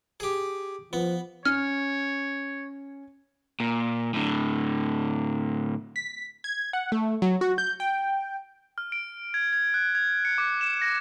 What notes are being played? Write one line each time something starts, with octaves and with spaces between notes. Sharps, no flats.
G4 G#4
F3 B3
C#4 C#5 F6
A#2
A2 D3
B6
G#6
F#5
A3
F#3
F#4
G6
G5
F6
D7
G#6
G#6
F#6
G#6
C#7
D6
E7
A#6